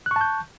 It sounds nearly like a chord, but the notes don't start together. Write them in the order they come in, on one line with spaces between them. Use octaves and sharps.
F#6 C#6 A5 G6